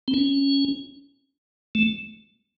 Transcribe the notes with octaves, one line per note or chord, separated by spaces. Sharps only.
C4
C#4
A3